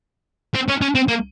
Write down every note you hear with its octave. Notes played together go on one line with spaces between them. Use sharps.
C4
C#4
C#4
C4
A#3